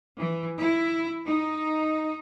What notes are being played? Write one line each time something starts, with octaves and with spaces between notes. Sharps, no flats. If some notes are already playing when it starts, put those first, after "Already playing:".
E3
E4
D#4